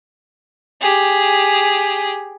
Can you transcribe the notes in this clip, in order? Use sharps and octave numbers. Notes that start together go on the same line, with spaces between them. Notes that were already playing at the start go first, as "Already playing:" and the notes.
G4 G#4